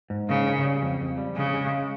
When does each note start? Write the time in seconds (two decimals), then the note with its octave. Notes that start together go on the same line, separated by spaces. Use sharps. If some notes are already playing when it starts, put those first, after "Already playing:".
0.10 G#2
0.28 C#3 A#3
0.46 C#4
0.64 G3
0.82 F2
1.00 F2
1.18 G3
1.36 C#3 G#3
1.54 G#3
1.72 G#3